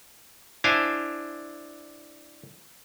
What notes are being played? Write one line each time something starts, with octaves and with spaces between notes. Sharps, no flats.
D4 E4 C5 F5 G#5 A5